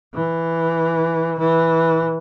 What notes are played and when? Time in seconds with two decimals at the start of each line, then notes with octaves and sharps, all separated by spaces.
0.14 E3
1.38 E3